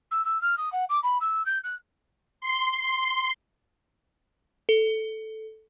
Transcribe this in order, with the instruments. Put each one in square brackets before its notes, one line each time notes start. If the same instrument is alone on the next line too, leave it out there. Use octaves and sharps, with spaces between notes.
[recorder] E6
E6
F6
D#6
F#5
D6
B5
E6
G6
F#6
[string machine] C6
[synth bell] A4